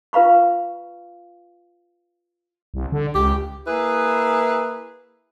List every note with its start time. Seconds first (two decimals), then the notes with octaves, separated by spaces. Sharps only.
0.13 F4 B4 F5 B5 C#6
2.74 C2
2.92 D3
3.15 C#2 G4
3.67 A#3 E4 G#4 B4